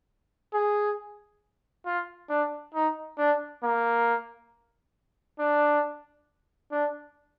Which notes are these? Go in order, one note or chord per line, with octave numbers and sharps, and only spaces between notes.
G#4
F4
D4
D#4
D4
A#3
D4
D4